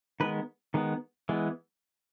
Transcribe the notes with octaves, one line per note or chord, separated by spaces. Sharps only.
D#3 G#3 B3 B4
D#3 G#3 B3
E3 G#3 B3